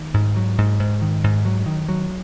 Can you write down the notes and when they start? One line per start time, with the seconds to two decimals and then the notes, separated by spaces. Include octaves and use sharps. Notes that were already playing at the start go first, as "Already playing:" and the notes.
Already playing: D#3
0.14 G#2
0.36 F#3
0.58 G#2
0.80 G#2
1.02 D#3
1.24 G#2
1.45 F#3
1.66 D#3
1.89 F#3